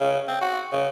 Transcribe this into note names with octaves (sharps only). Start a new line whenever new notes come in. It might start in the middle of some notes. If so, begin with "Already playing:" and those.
C#3
C4
F#4
C#3